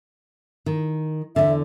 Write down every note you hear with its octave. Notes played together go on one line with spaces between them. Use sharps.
D#3
E2 D3 E5